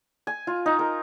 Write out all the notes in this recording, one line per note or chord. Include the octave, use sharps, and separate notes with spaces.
G#5
F4
D#4
A#4